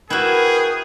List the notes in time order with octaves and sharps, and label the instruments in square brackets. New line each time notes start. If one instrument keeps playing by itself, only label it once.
[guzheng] E4 F#4 [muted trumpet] G#4 [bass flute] A#4 [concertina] B4 G5